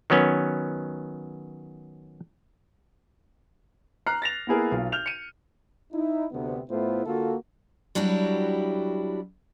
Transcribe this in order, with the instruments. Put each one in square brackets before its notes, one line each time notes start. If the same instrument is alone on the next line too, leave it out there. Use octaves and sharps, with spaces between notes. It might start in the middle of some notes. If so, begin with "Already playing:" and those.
[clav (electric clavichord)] D#3 F#3 B3 C#4
[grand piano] A#5 F6 F#6 C7
A6 A#6 F7
A#3 B3 E4 G#4 A#4
B1 F4
F6 G6 F7
C#7 D#7
[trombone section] D#4 E4
D2 C3 B3
A2 A3 B3 E4 F4 C5
D3 A#3 F4 F#4 A4
[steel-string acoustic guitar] F#3 G3 D4 E4 F#4 G4